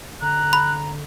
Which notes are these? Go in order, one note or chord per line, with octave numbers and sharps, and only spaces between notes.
D3 A#5 F#6
B5